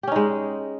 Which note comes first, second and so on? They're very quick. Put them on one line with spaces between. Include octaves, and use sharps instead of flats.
G4 C#4 D#4 G#3